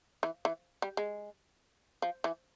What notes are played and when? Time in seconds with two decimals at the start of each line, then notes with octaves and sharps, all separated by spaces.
0.23 E3
0.45 E3
0.82 G3
0.97 G#3
2.02 F3
2.24 E3